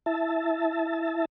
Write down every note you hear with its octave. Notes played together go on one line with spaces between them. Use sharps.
E4 E5 A5